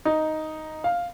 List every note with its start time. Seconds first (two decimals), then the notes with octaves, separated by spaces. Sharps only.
0.05 D#4
0.84 F5